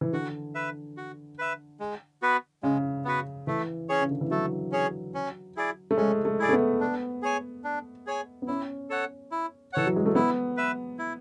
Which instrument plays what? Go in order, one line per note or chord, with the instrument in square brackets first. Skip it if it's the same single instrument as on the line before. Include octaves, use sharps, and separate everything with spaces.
[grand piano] E3
[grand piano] D3 [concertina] F#4
[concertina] B4 E5
F#4
B4 E5
G#3
B3 F#4 B4
[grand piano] C#3 [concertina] G#3
[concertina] B3 F#4 B4
[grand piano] E3 [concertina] A3
[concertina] C#4 G#4 C#5
[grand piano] C#3
D3
E3
[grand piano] F#3 [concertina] A3
[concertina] C#4 G#4 C#5
C#4
E4 G#4 D5
[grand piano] A3
[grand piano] G#3 [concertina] C#4
[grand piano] A3
[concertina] E4 G#4 D5
[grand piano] A3
B3
[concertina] D4
G#4 C#5 G#5
D4
G#4 C#5 G#5
[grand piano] B3
[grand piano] C#4 [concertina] E4
[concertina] A4 C#5 F#5
E4
[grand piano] E3 [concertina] A4 C#5 F#5
[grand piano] F#3
G#3
A3
[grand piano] B3 [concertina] E4
[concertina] B4 E5
E4